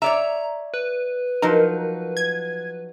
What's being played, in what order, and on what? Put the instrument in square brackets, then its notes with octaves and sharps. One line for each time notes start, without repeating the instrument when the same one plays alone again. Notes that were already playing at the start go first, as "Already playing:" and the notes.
[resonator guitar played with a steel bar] C#5 D5 E5 [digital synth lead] A#5
[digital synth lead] B4
[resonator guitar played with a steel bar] F3 F#3 D#4 [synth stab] A#4
[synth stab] G#6